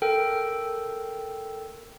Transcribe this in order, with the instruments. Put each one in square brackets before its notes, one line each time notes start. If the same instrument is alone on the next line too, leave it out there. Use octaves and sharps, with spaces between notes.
[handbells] A4 A#4 G5